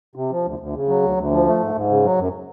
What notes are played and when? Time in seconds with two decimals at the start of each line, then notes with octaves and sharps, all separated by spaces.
0.15 C3
0.31 F3
0.45 D2
0.59 D2
0.74 C#3
0.88 F#3
1.02 D2
1.17 D2
1.31 F3
1.45 A3
1.60 G#2
1.75 G#2
1.89 C#3
2.04 F#3
2.18 F#2